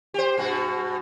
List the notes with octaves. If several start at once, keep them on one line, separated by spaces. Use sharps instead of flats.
G4 C5
G2 B2 F#4